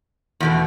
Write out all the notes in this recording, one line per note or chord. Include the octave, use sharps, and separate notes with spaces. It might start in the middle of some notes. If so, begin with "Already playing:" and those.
E2 B2 A3